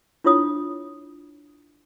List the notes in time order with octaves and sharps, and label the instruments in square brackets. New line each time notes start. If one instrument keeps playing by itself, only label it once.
[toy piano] D4 E4 F4 C#5 D#6